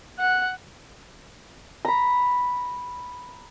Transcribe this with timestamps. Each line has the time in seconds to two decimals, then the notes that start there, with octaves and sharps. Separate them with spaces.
0.19 F#5
1.85 A#5 B5